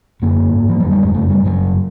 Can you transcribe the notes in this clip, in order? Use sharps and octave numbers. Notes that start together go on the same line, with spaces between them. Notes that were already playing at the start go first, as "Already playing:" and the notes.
F#2 D3 A#3
G#2
F3
F2 D3 F#3
G3
G#3
F#2 C#3 A3
G3
F#2 C#3 F#3